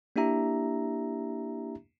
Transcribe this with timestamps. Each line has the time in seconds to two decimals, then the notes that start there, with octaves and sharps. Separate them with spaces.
0.16 A#3 D4 E4 G4 E5 A#5